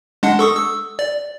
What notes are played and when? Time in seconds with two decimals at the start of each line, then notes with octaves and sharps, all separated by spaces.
0.23 G#3 D4 F#5
0.39 A4 C#6 D#6
0.56 E6
0.99 D5